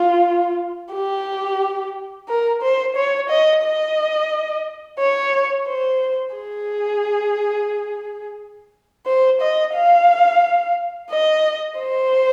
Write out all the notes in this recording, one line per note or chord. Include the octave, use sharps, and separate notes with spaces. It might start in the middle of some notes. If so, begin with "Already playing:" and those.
Already playing: F4
G4
A#4
C5
C#5
D#5
D#5
C#5
C5
G#4
C5
D#5
F5
D#5
C5